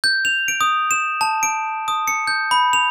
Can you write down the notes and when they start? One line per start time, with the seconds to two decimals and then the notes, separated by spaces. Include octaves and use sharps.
0.04 G6
0.25 F7
0.48 D7
0.61 D#6
0.91 E7
1.21 A5
1.43 D7
1.88 D#6
2.08 C#7
2.27 G6
2.51 B5
2.73 F7